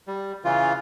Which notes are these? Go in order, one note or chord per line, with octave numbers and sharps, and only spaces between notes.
G3
C#3 E3 F4